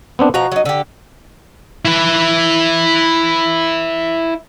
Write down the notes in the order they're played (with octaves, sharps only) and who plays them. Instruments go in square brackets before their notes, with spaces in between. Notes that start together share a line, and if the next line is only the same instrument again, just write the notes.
[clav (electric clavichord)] B3 C4 D4
[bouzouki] B2 F3 A#5 [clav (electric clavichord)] F#4
[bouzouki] F#3 D#4
D3 G4
[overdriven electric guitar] E4 B4